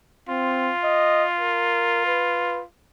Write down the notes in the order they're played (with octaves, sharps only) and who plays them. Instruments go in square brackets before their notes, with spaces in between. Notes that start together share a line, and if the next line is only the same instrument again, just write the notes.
[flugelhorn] C4 [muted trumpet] F4
[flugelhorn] D#5
A#4
B4